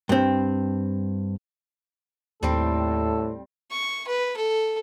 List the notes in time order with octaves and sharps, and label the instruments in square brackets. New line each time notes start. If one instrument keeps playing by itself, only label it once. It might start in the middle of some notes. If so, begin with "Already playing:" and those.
[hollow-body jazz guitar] G2 C4
[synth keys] D#2 [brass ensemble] A2 [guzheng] G3 C4 [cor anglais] A4
[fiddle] C#6
B4
A4